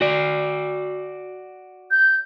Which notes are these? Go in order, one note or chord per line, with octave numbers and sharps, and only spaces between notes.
F#4 D5
G6